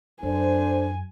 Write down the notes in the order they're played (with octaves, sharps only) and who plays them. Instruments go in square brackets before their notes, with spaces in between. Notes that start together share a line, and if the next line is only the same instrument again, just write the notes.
[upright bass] F#2 [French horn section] D4 A4 C5 [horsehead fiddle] G#5